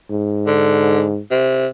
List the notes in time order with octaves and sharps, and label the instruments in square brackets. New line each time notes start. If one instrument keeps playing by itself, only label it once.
[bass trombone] G#2
[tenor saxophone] D3
C3